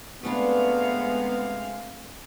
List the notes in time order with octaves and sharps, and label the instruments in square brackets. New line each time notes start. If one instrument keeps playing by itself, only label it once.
[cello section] C3 G#3 F5 [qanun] A3 D4 B4 [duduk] B3